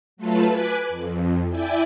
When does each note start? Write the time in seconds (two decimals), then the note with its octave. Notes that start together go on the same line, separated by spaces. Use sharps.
0.17 F#3 A3 F4 A4 B4
0.47 B4 G#5 B5 D6 F#6
0.89 F2
1.49 E4 D5 E5 G5 G#5